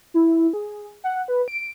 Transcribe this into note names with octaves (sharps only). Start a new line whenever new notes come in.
E4
G#4
F#5
B4
D7